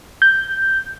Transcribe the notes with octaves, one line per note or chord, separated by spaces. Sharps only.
G6